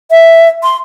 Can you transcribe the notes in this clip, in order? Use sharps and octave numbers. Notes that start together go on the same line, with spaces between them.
E5
C6